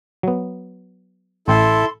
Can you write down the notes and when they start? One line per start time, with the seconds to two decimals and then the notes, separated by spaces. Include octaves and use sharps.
0.23 F#3 B3
1.48 A1 E4 A4 G5 C6